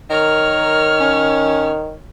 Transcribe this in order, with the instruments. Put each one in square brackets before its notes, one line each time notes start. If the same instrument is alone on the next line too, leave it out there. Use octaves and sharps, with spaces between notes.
[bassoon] D#3 [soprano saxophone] A#4 [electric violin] C#5 F6
[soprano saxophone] C#4